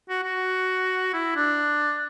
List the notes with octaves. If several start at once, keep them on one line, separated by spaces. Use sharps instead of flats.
F#4
F#4
E4
D4